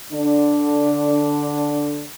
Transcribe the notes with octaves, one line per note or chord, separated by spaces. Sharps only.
D3 D4